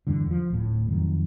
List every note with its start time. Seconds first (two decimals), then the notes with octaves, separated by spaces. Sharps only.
0.07 E2 G2 D3
0.31 F3
0.50 D1 A2
0.88 F2 D#3 F#3